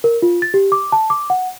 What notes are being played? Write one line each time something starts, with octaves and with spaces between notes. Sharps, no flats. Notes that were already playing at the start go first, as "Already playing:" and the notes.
A#4
F4
A6
G4
D6
A5
D6
F#5